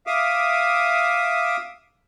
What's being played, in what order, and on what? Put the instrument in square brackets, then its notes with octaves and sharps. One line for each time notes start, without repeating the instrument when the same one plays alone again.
[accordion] E5 F5 D6 D#6